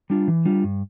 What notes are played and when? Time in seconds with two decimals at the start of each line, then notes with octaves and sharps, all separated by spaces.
0.10 G3 D4 F4
0.28 E3
0.45 G3 D4 F4
0.64 G2